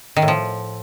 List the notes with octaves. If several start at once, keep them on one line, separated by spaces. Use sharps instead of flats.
D#3
A2
F3